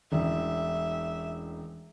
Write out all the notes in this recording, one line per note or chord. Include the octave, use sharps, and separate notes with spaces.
E1 A1 E5